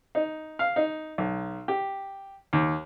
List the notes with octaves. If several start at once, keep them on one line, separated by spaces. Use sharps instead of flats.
D#4
F5
D#4
B1
G4
D#2